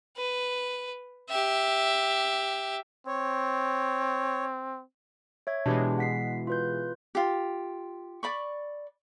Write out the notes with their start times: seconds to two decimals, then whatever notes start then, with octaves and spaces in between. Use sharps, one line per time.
0.17 B4
1.30 G4 E5
3.07 C4 C#5
5.47 C#5 E5 G#6
5.66 B2 E3 G#3 D4 G4
5.98 F#5 B6 C7
6.47 F4 B4 G6
7.15 F4 G4
8.23 D5 B5 C#6